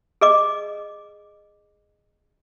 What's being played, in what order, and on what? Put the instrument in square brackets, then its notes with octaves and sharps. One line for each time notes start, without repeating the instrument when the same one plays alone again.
[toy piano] G#4 D#5 D6